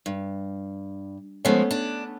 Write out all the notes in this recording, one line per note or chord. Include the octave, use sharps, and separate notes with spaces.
G2
F3 G#3 A3 B3 C#4
D4